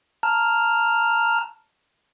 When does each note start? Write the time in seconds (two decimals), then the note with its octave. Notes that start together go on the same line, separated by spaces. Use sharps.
0.23 A5 A#5 F6